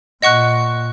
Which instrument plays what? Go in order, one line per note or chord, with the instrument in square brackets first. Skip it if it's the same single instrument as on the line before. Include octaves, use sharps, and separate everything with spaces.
[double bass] A#2 [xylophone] D#5 F#5 C#6 F#6